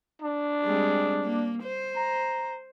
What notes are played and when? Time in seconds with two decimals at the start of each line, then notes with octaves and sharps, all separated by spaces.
0.22 D4
0.64 G3 G#3 C4
1.23 A#3
1.63 C5
1.96 A#5